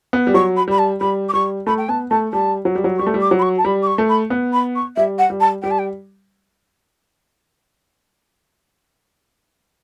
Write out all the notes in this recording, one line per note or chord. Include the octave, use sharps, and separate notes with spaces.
B3
G3
F#3 C#6
B5
G3 B5
A5
G3 B5
D6
G3 C#6
A3 B5
G5
B3 A5
A3 A5
G3 A5
F#3
G3
F#3
G3 C#6
A3
G3
D6
F#3
B5
C#6
A5
G3 B5
D6
C#6
A3
B5
B3
B5
C#6
G3 E5
F#5
G3
A5
G3 G5
A5
G5